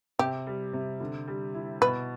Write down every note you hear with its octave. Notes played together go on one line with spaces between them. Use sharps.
C3 G4
G3
C3
D3
G3
E4
B2 B4